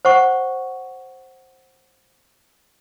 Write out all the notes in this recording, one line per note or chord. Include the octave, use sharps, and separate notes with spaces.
C5 F#5 C#6